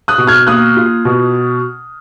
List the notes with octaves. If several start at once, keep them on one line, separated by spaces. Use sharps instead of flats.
D#6 F#6
B2
F6 G#6
A#3 D#6 F#6
F4
B2